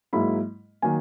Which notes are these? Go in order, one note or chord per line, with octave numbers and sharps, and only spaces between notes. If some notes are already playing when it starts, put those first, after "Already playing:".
G#2 F#3 A#3 E4 B5
D#3 F#3 A#3 G#5